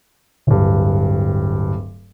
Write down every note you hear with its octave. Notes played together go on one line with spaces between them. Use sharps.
D1 G2